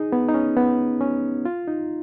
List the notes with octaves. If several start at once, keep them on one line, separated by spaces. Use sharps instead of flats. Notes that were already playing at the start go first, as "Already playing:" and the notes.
Already playing: D#4 G#4
B3
D#4
C#4
B3
C#4
F4
D#4